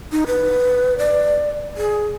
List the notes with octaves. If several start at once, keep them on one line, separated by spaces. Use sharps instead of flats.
D#4
B4
D5
G#4